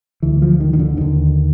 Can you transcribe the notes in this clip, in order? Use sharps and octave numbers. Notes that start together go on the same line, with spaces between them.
D2 D3 E3
F3
D#3
D#3
D3
D#2 D3 D#3